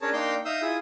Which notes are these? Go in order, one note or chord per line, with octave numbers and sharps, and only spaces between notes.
C#4 D4 G#4 A#4 C#5 A5
A#3 D4 D#4 G5 C6 D6
D#4 E5 F5 D#6 E6 G6
E4 F4 G#4 E5 D#6